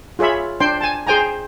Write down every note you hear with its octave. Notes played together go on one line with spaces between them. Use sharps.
F4 G#4 C#5 E5 B5
D4 C5 G5 C6
G#5 A5
G#4 C5 G5 G#5 A#5